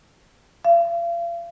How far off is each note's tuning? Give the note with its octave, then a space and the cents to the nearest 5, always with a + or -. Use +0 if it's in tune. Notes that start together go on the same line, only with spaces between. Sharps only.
F5 -40